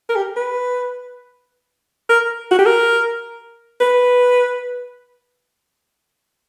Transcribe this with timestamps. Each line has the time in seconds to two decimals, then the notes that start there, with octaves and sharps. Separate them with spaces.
0.09 A#4
0.16 G4
0.37 B4
2.09 A#4
2.51 F#4
2.59 G4
2.66 A#4
3.81 B4